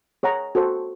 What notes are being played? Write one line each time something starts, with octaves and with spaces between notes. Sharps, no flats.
G#4 C#5 F#5 A#5
F#4 A4 C5